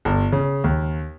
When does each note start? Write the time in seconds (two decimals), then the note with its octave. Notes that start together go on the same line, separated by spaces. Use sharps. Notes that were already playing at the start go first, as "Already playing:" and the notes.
0.05 G1
0.32 C#3
0.64 D#2